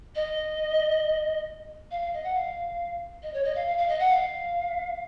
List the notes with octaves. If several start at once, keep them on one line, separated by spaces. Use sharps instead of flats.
D#5
F5
F5
D#5
F#5
F5
D#5
C#5
D#5
F5
F5
F5
D#5
F#5
F5